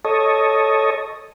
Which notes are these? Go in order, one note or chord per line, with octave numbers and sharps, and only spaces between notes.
A4 C#5 D#5